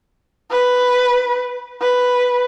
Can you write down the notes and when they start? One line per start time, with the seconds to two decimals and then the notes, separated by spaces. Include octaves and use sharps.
0.51 B4
1.81 B4